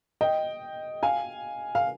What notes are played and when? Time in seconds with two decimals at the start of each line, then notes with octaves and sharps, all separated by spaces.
0.21 D#5 G5
1.03 F5 G#5
1.75 F5